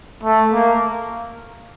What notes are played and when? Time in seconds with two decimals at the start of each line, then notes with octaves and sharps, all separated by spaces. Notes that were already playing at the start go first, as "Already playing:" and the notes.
0.23 A3
0.53 A#3